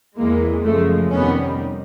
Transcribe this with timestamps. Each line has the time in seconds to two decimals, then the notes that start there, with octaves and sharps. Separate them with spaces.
0.17 E2 C3 E3 G#3 A#3
0.65 F#2 C#3 F3 G#3 A3
1.12 F2 C3 D#3 G3 B3 C#4